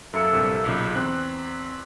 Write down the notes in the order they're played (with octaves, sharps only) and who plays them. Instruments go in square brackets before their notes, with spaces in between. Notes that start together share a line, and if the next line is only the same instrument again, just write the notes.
[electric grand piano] F#2 C#7 [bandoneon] A#3 E4 A4
[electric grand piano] A#1 G2 C3
[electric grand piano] B1 A#2 C#3 [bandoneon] B5
[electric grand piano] E2 C4 F#6